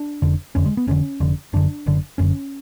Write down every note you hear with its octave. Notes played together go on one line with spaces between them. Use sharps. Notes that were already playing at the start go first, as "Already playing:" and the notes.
Already playing: D4
F1 F2 D3
F1 F2 D3 C#4
G#3
B3
F1 F2 D3 C#4
F1 F2 D3
F#1 F#2 D3 D4
F#1 F#2 D3
F#1 F#2 D3 C#4